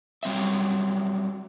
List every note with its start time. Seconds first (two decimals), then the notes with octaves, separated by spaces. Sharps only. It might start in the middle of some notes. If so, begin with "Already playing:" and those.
0.23 F#3 G3 C4 D#5 E5